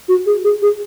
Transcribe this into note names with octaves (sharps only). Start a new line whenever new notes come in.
F#4
G#4
G#4
G#4